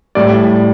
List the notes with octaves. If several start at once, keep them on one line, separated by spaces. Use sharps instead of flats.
A2 G3 D5